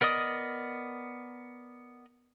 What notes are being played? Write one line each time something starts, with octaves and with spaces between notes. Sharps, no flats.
B3 A#4 D5 D#5 D#6